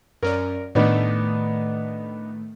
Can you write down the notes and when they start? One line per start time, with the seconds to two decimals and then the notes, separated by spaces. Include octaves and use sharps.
0.23 F#2 C#4 A#4 D5
0.75 A2 D#3 A3 B3 D4 D#4